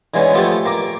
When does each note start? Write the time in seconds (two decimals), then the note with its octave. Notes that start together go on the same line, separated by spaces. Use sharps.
0.14 D3 E3 G#3 B3 C#4
0.33 F3 A3 B3 F4 G4 A4
0.65 A#3 A#5 D6